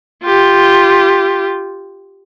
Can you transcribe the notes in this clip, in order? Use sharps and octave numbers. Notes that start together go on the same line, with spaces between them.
F4 G4